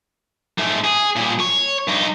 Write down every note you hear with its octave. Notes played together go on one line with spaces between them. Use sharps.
G#2 A3
G#4
A#2 G3
C#5
G2 D#4